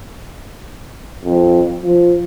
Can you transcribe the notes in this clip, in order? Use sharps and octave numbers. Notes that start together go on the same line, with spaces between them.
F2
F3